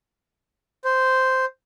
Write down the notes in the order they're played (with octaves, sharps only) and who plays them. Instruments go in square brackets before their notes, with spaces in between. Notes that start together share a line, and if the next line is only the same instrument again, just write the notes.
[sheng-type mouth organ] C5